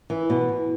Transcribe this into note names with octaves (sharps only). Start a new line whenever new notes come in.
E3
B2